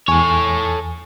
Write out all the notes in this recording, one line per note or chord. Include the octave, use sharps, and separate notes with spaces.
E2 A4 C#5 G#5